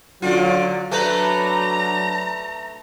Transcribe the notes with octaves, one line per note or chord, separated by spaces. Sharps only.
D3 F#3 F4
F#3 A3 D4 B4 A#5